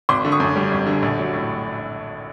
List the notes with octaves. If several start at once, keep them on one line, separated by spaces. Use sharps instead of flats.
G#1 C6 D6
D3
C#6 D#6
F#2
G3
G#1
D3
A#1
F#3
A2